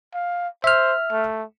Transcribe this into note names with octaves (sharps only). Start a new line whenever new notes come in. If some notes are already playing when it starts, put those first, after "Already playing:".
F5
C5 E5 F6
A3